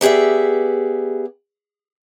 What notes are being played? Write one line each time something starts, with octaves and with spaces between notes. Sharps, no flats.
B3 G4 G#4 D5 E5